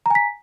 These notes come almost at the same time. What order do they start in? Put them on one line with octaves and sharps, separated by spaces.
A#5 G#5 B6